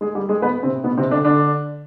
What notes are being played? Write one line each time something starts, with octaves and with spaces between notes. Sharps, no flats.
G#3 G#4
G3 G4
G#3 G#4
B3 B4
C3 C4
B2 B3
C3 C4
D3 D4
D3 D4